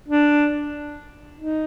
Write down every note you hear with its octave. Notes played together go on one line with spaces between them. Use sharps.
D4
D#4